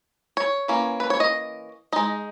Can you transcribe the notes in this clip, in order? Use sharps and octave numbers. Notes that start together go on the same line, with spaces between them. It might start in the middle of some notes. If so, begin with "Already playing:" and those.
C#5
E3 A#3 C#4
B4
C#5
D#5
G#3 D#4 D#5